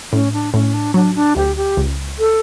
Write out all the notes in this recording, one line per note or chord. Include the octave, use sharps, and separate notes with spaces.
A2 C#4
D4
A2 C#4
D4
F#3 D4
D4
D2 G4
G4
C#2
A4